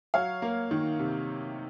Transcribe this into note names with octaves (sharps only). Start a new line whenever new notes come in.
F#3 C#5 F5
A#3
D#3
C3